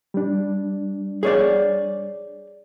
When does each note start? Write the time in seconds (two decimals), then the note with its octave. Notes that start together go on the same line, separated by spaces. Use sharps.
0.14 G3 D4
1.23 G#4 C#5 D5